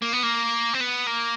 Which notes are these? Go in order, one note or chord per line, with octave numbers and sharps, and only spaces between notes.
A#3
B3
A#3
C4
B3
A#3